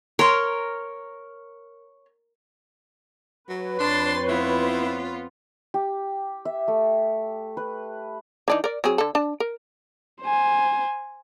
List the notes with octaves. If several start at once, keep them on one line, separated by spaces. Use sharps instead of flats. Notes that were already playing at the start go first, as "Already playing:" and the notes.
A#4 C#5 C6
F#3 B4 C#5
F2 C4 D4 C6 A6
B3 E4 F4
G4
E5
A3
B4
E3 D4 D#4
A#4 D5
F#3 C4 G#4
D3 A4
D4 A5
A#4
C5 G#5